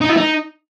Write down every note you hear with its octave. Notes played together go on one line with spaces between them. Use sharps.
D#4
E4
D#4